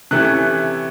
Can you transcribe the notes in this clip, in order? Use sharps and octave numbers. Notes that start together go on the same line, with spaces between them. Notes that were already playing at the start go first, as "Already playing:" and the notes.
C3 E3 A3 C#4 F#6